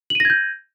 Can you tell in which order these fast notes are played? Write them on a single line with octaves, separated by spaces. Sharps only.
F#7 D#7 A#6 G#6 G6